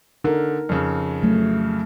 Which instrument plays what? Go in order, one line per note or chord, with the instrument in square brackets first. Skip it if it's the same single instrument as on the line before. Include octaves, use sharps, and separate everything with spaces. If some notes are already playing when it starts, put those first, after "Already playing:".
[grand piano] D3 [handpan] D#4 A#4
[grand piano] F2 C#3
[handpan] F#3 A3